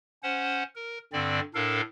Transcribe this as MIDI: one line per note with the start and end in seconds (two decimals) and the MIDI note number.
0.23 0.63 61
0.23 0.63 72
0.23 0.63 78
0.75 0.98 70
1.13 1.40 43
1.13 1.40 50
1.13 1.40 60
1.13 1.40 74
1.54 1.81 45
1.54 1.81 62
1.54 1.81 69
1.54 1.81 70
1.54 1.81 77